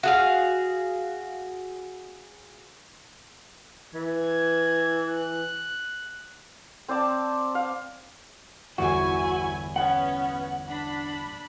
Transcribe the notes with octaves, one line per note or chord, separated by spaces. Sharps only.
F#4 G#4 F5
E3 G#6
F#6
C4 C5 D5 A5
F5
G1 E2 E4 F#4 G#5
B3 C#4 F#5
D4 B5